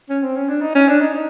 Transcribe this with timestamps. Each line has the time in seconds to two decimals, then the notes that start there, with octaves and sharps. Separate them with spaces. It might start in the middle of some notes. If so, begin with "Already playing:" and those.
0.09 C#4
0.23 C4
0.36 C#4
0.49 D4
0.61 D#4
0.75 C#4
0.88 D4
1.01 D#4
1.14 D#4